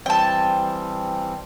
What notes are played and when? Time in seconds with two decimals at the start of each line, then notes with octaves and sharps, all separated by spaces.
0.06 E3 G3 C4 G5 A5